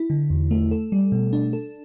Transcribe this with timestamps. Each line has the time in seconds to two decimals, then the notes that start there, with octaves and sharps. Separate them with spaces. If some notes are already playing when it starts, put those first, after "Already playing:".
Already playing: E4
0.10 D3
0.30 E2
0.51 A3
0.71 A4
0.92 G3
1.12 B2
1.33 D4
1.53 A4